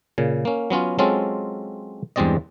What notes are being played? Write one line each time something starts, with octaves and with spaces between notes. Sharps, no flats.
A#2 C#3
A#3 C#4
F#3 B3 C#4 F4
F#3 G#3 C4 C#4 F4 A4
E2 G2 G#3 C4 D5 D#5